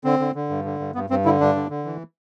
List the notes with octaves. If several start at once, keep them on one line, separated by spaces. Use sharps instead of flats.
D3 C4
D3
D3
G2
D3
G2
G2 B3
G2 C4
D3 E4
G2 D4
D3
D3
E3